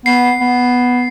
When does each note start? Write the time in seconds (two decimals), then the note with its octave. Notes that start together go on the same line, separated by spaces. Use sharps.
0.06 B3 C7
0.40 B3